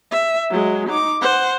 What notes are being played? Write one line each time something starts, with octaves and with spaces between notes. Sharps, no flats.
E5
F#3 G#3
D#4 D6
C5 F#5